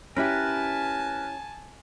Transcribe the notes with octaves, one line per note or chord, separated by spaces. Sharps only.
C#4 E4 G4 A#4 B4 G#5 A5